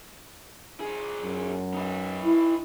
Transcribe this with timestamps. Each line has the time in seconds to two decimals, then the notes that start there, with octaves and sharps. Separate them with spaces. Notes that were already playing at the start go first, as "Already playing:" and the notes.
0.80 A#2 G#4
1.24 F#2
1.74 D#4 B4
2.24 E4